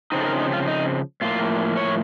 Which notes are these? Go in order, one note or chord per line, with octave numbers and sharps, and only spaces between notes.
C#3 F3 C4 D#4
A4
A#4
D#4
F4
D#4
A2 F3 A#3 F4
C#5